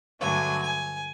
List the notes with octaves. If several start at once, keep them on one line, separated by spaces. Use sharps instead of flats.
G2 D3 F#3 A3 G#5
G#5